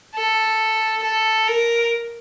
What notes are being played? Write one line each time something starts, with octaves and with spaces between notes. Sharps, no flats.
A4
A4
A#4